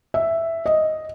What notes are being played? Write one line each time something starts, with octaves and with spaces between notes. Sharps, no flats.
E5
D#5